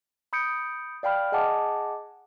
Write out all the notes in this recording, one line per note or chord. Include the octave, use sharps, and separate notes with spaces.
B5 D#6 G6 C#7 D7
D5 F5 G5 B5 F6
G#4 D#5 F#5 G#5 A5 D6